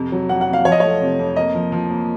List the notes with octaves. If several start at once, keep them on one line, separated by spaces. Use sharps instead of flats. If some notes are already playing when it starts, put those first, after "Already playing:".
Already playing: F2 C3
F#3
F2 F#5
F#5
F2
F5
F3 C#5
D#5
A3 C#5
C3
F2
A#3 D#5
F3
F3
A#3